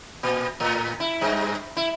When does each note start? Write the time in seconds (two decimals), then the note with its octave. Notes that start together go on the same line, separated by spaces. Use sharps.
0.23 A#2
0.60 A2
1.00 E4
1.21 G2
1.77 E4